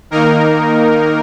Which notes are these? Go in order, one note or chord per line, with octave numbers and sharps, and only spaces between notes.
D#3 A#3 D#4 A#4